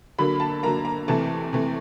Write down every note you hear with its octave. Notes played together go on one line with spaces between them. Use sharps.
D3 F#3 A#3 B5
A5
D3 F#3 A#3 A#5
A#5
C3 E3 A3 A5
C3 E3 A3